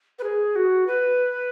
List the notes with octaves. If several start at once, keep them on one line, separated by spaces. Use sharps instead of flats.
B4
G#4
F#4
B4